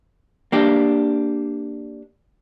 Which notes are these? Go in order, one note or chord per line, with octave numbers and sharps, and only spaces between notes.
A#3 D4 G4